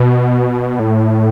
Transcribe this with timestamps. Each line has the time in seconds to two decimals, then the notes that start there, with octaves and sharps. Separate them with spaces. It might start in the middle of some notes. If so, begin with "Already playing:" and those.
Already playing: B2
0.79 A2